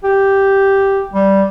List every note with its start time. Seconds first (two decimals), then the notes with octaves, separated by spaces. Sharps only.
0.04 G4
1.13 G3